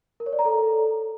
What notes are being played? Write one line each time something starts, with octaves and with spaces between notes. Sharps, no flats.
A#4
C#5
D5
A#5
A4